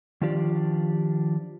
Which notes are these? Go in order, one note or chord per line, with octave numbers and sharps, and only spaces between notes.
D#3 F3 D4 F4 G4 D5